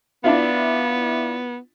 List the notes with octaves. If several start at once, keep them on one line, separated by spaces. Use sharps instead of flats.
B3 D4 E4 F4